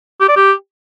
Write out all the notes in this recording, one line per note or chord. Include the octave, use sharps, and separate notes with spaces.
G4
D5
G4